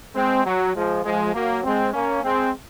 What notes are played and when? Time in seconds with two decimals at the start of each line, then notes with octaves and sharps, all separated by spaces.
0.15 G#3 C4
0.45 F#3
0.75 F3 G#3
1.04 F3 G#3
1.34 F#3 A#3
1.64 G#3 C4
1.93 A#3 C#4
2.24 G#3 C4